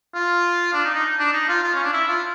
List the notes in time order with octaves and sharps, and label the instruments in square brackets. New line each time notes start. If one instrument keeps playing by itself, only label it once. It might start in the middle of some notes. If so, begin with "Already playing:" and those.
[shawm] F4
D4
D#4
D#4
D4
D#4
F4
F4
C#4
D4
E4
F4